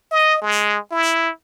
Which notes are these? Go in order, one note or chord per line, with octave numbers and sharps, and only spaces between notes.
D#5
G#3
E4